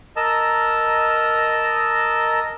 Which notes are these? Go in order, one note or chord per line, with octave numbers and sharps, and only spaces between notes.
A#4 D#5 A5 A#5 E6